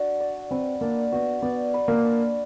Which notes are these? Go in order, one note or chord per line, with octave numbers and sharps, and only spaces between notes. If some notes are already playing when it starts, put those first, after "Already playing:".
Already playing: D4 F#4
D5
C4 B4
A#3 D4
B3 F#4
B3 D5
B4
A#3
D4